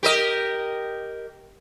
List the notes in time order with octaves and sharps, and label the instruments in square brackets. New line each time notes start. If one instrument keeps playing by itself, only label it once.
[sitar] G4 A#4 D#5